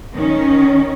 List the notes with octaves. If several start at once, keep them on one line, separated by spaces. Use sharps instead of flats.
D#3 C#4